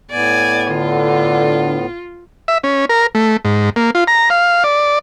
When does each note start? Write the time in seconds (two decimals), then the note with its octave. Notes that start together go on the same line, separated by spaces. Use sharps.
0.11 A2 B3 D5 G#5
0.71 D3 F4
2.48 E5
2.64 C#4
2.89 A#4
3.15 A3
3.45 G#2
3.76 A#3
3.95 F4
4.07 A#5
4.30 F5
4.64 D5